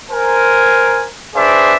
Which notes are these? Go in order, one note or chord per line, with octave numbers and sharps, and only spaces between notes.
A#4 C5 G#5
D4 G#4 B4 C5 D5 E5